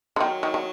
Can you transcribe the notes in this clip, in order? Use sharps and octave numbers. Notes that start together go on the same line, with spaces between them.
D3
D#3 F#3
D#3
D#3